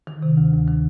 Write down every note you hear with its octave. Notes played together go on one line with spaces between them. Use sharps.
D#3
C3
D2
D2
D#3